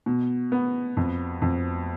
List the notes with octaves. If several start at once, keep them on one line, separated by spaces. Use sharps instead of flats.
B2
B3
F2
F2